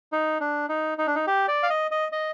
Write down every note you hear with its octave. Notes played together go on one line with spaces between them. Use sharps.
D#4
D4
D#4
D#4
D4
D#4
G4
D5
F5
D#5
D#5
D#5